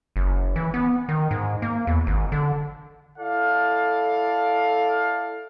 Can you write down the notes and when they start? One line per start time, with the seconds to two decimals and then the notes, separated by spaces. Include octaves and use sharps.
0.16 F#1
0.56 E3
0.74 B3
1.09 D#3
1.31 G#2
1.62 A#3
1.87 E2
2.07 G#1
2.32 D3
3.18 E4 A4 D5 F5